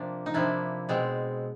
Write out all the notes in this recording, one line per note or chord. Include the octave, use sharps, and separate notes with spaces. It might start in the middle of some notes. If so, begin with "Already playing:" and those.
Already playing: C3 F3 A#3 D4
D#4
C3 F3 A#3 D4 E4
B2 G#3 C4